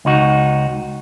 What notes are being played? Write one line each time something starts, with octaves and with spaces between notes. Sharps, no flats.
C#2 D#4 F#4